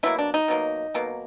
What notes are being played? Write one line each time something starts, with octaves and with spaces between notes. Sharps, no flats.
B2 F#3 A#3 E4
D4
D#4
B2 F#3 A#3
B2 F#3 A#3